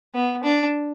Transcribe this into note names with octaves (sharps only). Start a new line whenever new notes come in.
B3
D4